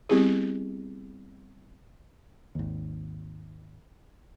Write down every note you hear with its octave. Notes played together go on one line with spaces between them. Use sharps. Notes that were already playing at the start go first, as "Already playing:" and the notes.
G3 B3 C4 E4 G4 G#4
G#1 D#2